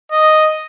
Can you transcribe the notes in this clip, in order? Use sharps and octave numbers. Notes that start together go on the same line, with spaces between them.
D#5